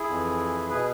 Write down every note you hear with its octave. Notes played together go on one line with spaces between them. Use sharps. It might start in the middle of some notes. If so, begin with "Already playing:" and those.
Already playing: E4 G#4
F2 E3
B2 G#4 B4